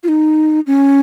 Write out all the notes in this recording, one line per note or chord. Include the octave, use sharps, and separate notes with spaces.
F4
D#4
C#4